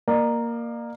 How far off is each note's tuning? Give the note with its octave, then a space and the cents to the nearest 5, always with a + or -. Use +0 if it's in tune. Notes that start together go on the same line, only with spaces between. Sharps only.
A#3 +0 D5 +45